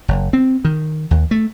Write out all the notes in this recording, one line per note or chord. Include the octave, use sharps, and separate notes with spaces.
F#1
C4
D#3
D#2
A3